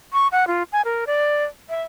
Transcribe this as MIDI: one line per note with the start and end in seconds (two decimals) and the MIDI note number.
0.13 0.27 85
0.32 0.47 78
0.47 0.63 65
0.72 0.82 80
0.85 1.05 70
1.07 1.44 74
1.69 1.82 76